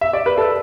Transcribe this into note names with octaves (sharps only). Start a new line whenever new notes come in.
E5
D5
B4
A4